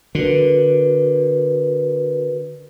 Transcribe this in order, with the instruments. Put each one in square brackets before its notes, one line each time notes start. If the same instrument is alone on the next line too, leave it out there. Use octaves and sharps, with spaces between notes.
[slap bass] D3 [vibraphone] F#4 A#4 B4